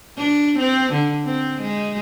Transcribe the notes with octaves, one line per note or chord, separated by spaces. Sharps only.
D4
C4
D3
C4
G#3